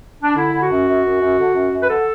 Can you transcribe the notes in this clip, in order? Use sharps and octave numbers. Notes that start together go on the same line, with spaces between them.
D4
D3 E4
D3
F#4
F#2
F#2
F#2
F#2
D3
F#2
F#2
B4
D3 A4